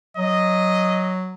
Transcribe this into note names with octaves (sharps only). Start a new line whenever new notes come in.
F#3 D#5